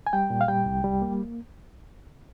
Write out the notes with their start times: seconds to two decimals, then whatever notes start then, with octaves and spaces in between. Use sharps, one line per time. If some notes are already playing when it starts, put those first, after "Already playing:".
0.07 G#5
0.13 G3 G5
0.30 A#2
0.41 F5
0.48 G3 G5
0.66 C2
0.84 G3
1.02 A#3